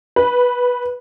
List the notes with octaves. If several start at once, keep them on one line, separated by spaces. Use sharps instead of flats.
B4